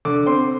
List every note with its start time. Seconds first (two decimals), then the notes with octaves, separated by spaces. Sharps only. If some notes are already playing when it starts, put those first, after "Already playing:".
0.05 D3 D6
0.26 C4 C6